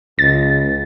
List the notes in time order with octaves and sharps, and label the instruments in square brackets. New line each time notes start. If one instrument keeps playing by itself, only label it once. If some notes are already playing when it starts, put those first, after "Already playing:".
[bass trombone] C#2 [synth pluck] A6